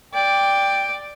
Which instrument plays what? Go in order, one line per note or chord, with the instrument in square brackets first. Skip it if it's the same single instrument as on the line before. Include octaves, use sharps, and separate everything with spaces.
[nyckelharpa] D5 [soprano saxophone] G5